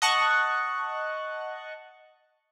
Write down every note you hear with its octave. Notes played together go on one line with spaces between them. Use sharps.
D#5 F#5 A5 C#6 F#6